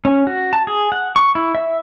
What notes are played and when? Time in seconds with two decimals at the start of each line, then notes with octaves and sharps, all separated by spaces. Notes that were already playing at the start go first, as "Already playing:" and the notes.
0.05 C#4
0.27 F#4
0.53 A5
0.67 G#4
0.92 F#5
1.16 C#6
1.35 E4
1.55 E5